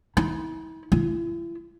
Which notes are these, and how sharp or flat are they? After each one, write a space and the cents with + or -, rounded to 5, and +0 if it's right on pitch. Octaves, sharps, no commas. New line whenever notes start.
E4 -45
E4 +35